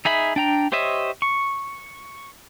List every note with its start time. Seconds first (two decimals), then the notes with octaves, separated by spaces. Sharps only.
0.05 D#4 G#4 E5 B5
0.36 D4 G5 A#5
0.72 G4 C5 C#5 D#5 E5
1.22 C#6